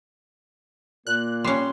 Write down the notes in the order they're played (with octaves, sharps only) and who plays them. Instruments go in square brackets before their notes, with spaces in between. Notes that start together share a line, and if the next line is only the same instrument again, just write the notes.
[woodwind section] A#2 A#3 [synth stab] F#6
[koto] G3 C#4 [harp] C6 C7